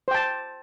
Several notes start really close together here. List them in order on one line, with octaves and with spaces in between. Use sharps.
C5 G5 A5